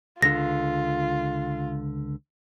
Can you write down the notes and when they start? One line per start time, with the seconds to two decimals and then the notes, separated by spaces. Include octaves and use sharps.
0.22 C#2 D3 F4 A#6